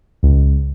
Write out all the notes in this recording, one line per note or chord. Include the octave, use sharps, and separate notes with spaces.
C#2